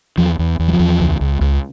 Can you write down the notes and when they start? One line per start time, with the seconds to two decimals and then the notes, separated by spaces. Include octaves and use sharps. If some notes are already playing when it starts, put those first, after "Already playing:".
0.18 E2 F3
0.39 E2
0.59 E2
0.68 F#3
0.73 F3
0.79 E2
1.00 C#2
1.21 C#2
1.41 C#2